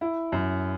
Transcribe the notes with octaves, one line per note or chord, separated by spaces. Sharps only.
E4
F#2